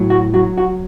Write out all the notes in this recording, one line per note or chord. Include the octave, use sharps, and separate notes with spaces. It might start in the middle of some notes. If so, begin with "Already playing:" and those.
Already playing: A2 F#3
F#4
F#3 F#4
F#4